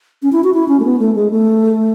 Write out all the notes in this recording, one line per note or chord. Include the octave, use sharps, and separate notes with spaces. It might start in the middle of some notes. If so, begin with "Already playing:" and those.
C#4
E4
F#4
E4
C#4
A3
B3
A3
G#3
A3